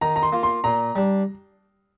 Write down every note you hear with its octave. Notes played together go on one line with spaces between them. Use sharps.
D#3 A#5
A#5
C6
A#3 F4
C6
A#2 A#5
G3 D4